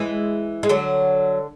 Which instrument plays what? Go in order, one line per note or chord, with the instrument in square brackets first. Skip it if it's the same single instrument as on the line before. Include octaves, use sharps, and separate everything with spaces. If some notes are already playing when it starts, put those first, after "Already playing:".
Already playing: [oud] E3 G#3
G#3
D3 F#3